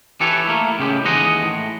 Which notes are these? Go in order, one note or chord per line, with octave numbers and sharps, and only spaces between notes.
E3 G4 A4 B4 C#5
A3 A#3 E4
A2 C#3 G#3 G4
D#2 E3 G#3 G#4 D#5 F#5
A2